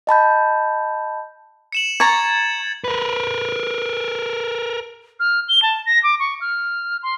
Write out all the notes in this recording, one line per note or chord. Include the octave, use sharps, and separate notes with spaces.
D#5 A5 B5 G6
C#7 E7 F#7
A#5 C#6 G#6 A6
A#4 B4
F6
G7
A5
A#6
D6
C#6
F6
C6